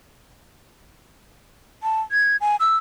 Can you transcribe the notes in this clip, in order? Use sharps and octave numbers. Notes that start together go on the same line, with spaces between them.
A5
G#6
G#5
E6